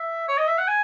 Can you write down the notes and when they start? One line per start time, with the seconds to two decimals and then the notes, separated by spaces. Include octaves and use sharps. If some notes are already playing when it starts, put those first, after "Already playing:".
Already playing: E5
0.28 C#5
0.38 D#5
0.47 E5
0.58 F#5
0.68 G#5